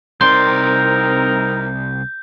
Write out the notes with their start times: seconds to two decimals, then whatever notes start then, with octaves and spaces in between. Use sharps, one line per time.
0.21 C2 C4 D#4 A#4 D5 C6 G6